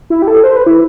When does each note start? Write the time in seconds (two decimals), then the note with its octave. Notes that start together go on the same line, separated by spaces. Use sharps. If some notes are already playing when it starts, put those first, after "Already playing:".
0.10 E4
0.22 G4
0.27 A4
0.44 C5
0.56 B4
0.67 E4